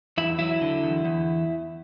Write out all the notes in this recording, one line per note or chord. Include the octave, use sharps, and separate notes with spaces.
E2 E4
F#3 E4
D3
E2
E2